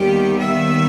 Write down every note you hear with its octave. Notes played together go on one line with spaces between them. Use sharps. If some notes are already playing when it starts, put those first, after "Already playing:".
Already playing: D#2 D#3 G3 B3 G4
E5